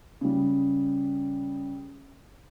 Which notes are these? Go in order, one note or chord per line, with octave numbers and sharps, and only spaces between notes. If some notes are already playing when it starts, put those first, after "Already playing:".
C#3 G3